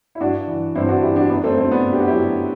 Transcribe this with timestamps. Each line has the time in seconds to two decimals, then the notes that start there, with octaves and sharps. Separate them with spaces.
0.15 E4
0.20 G2 D4 F#4
0.48 E3
0.75 G2 C4 E4
0.88 D4 F#4
1.02 E3 E4 G4
1.16 D4 F#4
1.29 F#2 B3 D4
1.44 A3 C4
1.57 F#3 A3 C4
1.71 B3 D4
1.85 F#2
1.93 G4
2.00 F#4
2.07 F#3 E4 G4